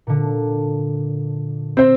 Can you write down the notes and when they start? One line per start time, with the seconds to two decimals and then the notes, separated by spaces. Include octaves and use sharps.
0.07 A#2 D3
1.77 C4 C5